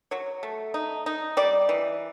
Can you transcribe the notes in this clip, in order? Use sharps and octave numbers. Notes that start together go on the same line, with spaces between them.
F#3 C#5
A3
D#4
D#4
G3 D5
E3